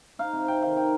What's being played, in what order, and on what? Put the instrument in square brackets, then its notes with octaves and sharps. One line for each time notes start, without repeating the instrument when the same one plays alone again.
[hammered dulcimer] D#4 F5
C3
C3 G5
D#3 F5
D#4 G5